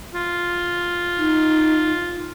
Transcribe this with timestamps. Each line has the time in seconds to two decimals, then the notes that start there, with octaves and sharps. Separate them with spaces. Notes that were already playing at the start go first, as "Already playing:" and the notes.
0.15 F4
1.18 D#4